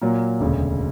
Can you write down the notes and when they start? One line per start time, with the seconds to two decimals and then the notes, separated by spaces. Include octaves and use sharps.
0.01 A#2 F#3 A#3
0.40 E1 D2 C#3